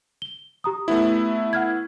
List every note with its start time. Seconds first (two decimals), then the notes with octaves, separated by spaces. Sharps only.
0.22 G7
0.64 G4 A#5 D#6
0.88 A3 B3 E4
1.53 F#5 F6 G#6